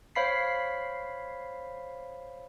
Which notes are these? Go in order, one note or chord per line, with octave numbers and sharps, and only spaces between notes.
C5 C#5 F5 B5 B6 C7